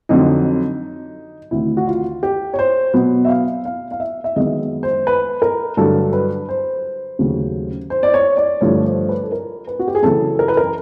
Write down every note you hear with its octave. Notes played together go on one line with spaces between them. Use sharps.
F2 D3 F#3 D#4
D2 C3 D#3 E4
F#4
F4
G4
C#5
C5
B2 F#3 B3
E5
F5
F5
F5
E5
E5
F#2 D#3 G#3 B3 D#5
C5
B4
A#4
G2 D3 F#3 A4
B4
C5
D#2 C#3 F#3 A3
C5
D5
C#5
D5
G2 D3 F3 A3 C#5
C5
B4
A4
A#4
B4
F#4
G4
G#4
F#2 C#3 E3 A4
A#4
B4
A#4